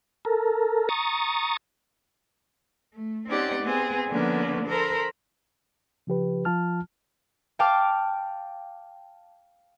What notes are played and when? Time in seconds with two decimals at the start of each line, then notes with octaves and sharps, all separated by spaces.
0.25 A4 A#4
0.89 A#5 C#6 D#6 A6
2.94 A3
3.29 C4 C#4 D#4 G4 D5 F#5
3.62 B3 C4 G#4
4.09 D3 F3 A#3 B3 C#4 D4
4.68 A4 A#4 C5 A#5 B5
6.07 C#3 F3 G4 B4
6.45 F3 F4 A5 F6
7.59 F5 G5 A5 D6 F6